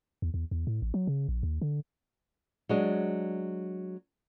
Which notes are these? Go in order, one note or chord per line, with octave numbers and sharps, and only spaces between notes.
E2
E2
E2
A2
A1
F#3
C#3
A#1
D#2
D3
F#3 G#3 D4